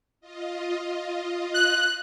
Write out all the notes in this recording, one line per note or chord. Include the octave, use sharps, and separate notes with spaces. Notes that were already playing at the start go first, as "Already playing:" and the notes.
F4 D#5
F#6